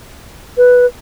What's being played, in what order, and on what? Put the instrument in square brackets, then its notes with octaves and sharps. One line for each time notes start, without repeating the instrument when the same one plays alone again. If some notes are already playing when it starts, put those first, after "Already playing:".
[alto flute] B4